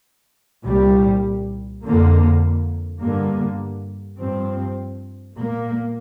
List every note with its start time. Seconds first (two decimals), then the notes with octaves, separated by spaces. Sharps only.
0.65 C2 A#2 G3
1.83 F2 D3 A#3
3.00 G2 D3 A#3
4.19 G2 F3 C4
5.35 A#2 A#3